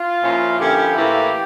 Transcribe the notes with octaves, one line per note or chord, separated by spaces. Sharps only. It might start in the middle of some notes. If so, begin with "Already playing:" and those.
Already playing: F4
A#2 F3 C#4 E4
D3 F3 A#3 C#4 E4 G4
A2 E3 A#3 E4